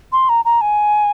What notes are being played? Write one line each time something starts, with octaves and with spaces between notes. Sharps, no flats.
C6
A#5
A#5
G#5